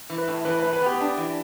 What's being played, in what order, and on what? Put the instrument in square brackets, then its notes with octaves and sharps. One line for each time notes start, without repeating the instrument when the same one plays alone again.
[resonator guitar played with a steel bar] E3
[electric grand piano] B4
[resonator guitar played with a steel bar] A2
[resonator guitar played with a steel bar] E3 [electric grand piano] B4
[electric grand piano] B4
[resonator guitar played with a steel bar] A2
[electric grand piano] B4
[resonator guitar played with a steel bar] B3 [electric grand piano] G4
[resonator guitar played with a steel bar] D4
E3